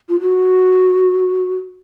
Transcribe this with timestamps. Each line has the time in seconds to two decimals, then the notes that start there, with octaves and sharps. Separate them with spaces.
0.09 F4
0.20 F#4